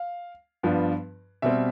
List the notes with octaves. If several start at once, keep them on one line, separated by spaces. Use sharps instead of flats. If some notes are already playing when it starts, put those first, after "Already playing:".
Already playing: F5
G2 F3 B3 D4
B2 G3 C4 E5